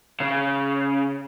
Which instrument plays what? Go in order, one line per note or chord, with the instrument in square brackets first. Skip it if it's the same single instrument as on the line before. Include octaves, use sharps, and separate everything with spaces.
[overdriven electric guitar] C#3